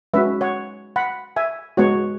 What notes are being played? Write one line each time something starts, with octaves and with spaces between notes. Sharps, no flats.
G#3 C#4 F#4 B4 E5
C#5 F#5
F#5 B5
E5 G#5
G#3 B3 F#4 C#5 F#5